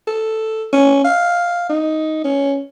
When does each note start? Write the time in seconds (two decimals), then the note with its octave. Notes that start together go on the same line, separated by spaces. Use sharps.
0.07 A4
0.73 C#4
1.05 F5
1.70 D#4
2.24 C#4